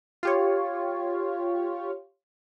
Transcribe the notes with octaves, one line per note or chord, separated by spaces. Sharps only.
F4 G4 C#5